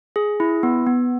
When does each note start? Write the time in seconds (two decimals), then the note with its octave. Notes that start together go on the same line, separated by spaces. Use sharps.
0.16 G#4
0.40 E4
0.63 B3
0.86 B3